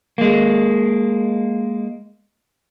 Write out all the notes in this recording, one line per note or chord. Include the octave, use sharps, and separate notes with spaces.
G#3 A#3